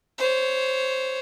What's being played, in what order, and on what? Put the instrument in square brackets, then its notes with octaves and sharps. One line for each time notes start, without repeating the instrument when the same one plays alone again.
[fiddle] C5 C#5